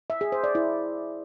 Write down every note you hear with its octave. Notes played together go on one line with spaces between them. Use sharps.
E5
G#4
C5
D5
E4